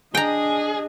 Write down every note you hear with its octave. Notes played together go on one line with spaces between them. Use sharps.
D4 G#4 D#5 G5 A#5